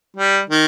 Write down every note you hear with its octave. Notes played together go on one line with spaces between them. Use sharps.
G3
D#3